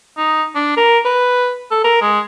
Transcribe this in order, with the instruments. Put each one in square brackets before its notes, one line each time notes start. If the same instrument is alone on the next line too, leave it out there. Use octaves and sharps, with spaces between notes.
[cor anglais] D#4
D4
A#4
B4
A4
A#4
G#3